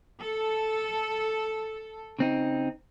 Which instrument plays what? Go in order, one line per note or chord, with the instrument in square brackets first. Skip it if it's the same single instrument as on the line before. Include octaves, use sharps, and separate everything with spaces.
[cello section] A4
[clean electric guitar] C#3 C4 D#4